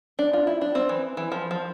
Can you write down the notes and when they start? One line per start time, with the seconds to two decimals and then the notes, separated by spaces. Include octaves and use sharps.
0.19 D4
0.33 F4
0.47 E4
0.61 D4
0.75 C4
0.89 E3
1.17 E3
1.32 F3
1.51 F3